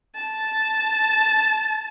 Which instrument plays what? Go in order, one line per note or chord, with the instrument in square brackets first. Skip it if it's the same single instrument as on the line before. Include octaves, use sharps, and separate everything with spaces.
[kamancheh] A5